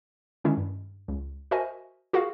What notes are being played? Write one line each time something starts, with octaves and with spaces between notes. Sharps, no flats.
D3 D#3 G#3 C#4 D4 E4
G2
C#2
F#4 A#4 C5 D#5 E5 G#5
F4 F#4 G#4 A#4 F5